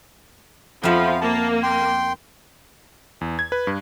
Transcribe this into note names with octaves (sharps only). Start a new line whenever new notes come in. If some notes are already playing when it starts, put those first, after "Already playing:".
F2 F3 B3 E5 F5
A#3 A5
G5 C6
E2
G#6
B4
G2